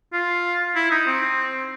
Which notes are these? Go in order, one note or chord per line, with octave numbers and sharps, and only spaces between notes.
F4
E4
D#4
C4